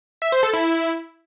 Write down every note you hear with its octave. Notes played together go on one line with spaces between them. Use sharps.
E5
C5
A4
E4